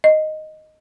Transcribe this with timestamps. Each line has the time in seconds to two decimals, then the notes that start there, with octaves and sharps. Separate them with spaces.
0.04 D#5